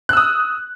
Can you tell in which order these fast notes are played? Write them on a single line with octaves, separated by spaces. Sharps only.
F#6 E6 D#6